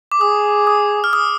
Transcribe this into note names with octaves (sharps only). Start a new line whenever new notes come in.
D6
G#4 D#6
D#6
F6
D#6